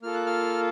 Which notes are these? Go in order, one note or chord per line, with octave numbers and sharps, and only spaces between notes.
A#3 F4 A4 F6
F#6
F6